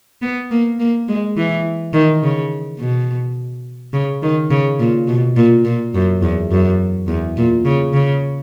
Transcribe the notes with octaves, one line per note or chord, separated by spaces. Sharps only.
B3
A#3
A#3
G#3
E3
D#3
C#3
B2
C#3
D#3
C#3
A#2
B2
A#2
A#2
F#2
E2
F#2
E2
A#2
C#3
C#3